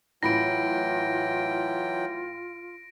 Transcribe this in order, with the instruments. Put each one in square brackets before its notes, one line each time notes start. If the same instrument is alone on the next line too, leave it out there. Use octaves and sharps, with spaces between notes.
[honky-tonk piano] A2 B5 [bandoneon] E3 F#3 G5 [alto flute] F4 [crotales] A#6 D7